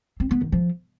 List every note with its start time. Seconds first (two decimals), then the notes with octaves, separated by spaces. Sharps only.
0.20 C4
0.31 B3
0.42 D#3
0.52 F3